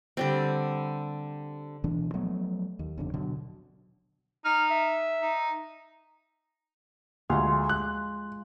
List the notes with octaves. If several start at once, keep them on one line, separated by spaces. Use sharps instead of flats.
D3 G3 C4
D2 B2 E3 D4
F3 F#3 A3 B3
D#2
G1 F2 D3
B2 D3 F#3
D#4 F6
E5
D#4
D2 G#3 F4
F#6